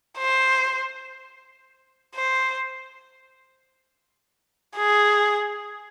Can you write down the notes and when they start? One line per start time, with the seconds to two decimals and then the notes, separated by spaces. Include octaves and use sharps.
0.18 C5
2.15 C5
4.77 G#4